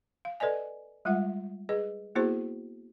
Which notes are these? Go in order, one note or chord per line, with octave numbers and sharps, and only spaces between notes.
F5
A4 B4 D5 D#5 G#5
G3 G#3 F4 E5 F#5
G#4 B4 D#5
A#3 B3 E4 F#4 G#4 C5